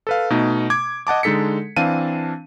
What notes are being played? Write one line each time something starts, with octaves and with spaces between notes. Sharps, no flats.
A4 B4 F5
B2 A3 D#4
D6 G#6
D#5 F#5 A5 D6
D3 G#3 D#4 A4 B6 C#7
E3 C4 D4 F5 A5 D#7